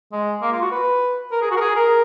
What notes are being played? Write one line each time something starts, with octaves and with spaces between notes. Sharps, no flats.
G#3
A#3
F4
F#4
B4
A#4
G#4
F#4
A#4
G#4
A#4